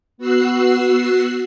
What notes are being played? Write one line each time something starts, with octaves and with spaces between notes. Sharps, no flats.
B3 F#4 E6 F#6 C7